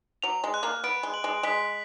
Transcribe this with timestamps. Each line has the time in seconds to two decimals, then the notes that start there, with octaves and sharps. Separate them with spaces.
0.22 F#3 F7
0.44 G#3
0.54 F#6
0.63 A#3
0.84 B3 D7
1.03 G#3
1.14 F#7
1.24 G#3
1.43 G#3 B6